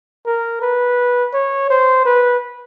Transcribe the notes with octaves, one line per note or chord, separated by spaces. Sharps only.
A#4
B4
C#5
C5
B4